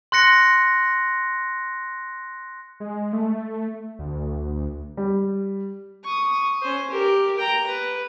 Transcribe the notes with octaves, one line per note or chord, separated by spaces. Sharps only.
C6 F#6 A#6 C#7
G#3
A3
D2
G3
C#6 D#6
C#4 C5
G4 A#4
G5 A#5
B4